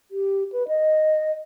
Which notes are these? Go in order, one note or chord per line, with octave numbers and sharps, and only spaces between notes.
G4
B4
D#5